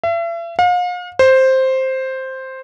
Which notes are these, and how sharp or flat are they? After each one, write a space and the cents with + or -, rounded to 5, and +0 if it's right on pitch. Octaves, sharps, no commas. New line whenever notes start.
E5 +40
F5 +40
C5 +5